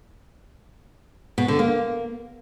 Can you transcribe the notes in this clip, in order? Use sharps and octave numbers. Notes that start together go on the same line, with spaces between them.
B2
D3
A#3